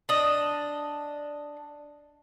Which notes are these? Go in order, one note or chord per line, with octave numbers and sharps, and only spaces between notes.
D4 D#5